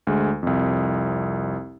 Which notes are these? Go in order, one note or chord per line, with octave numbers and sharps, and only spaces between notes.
D2 G#3
C2 F2